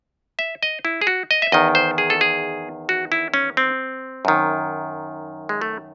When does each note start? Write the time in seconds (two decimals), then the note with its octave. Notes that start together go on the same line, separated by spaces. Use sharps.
0.39 E5
0.63 D#5
0.85 E4
1.02 G#4
1.07 F#4
1.31 D#5
1.42 E5
1.52 E2 D#3 D#5
1.75 C5
1.98 G#4
2.10 A4
2.21 G#4
2.89 F#4
3.12 E4
3.34 C#4
3.57 C4
4.25 F#2 D#3
5.49 G#3
5.61 A3